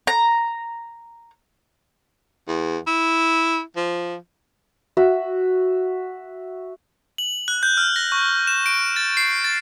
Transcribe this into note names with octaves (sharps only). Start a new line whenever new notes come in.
A#5
E2
E4
F3
F#4 E5
F#7
F#6
G6
F6
A#6
C#6
E7
D7
A6
C7
A6